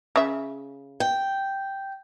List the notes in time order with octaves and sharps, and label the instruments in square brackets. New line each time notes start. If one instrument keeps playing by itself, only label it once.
[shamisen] C#3 E5
[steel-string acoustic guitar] G5